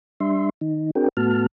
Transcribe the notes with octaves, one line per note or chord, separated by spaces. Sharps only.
G3 D4 E5 C6
D#3 D#4
C4 D4 F#4 G#4 A#4 G5
A2 A3 B3 F#4 A5 F6